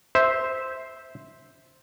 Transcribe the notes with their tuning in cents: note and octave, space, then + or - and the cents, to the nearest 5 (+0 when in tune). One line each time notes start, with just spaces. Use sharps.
C5 +0 E5 -10